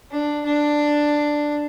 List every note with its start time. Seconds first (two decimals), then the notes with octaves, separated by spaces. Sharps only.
0.11 D4
0.45 D4